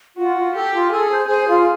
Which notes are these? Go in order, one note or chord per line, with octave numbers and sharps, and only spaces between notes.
F4 F#4
F4
G4 A4
F4
G#4 A4
C5
G#4 C5
F4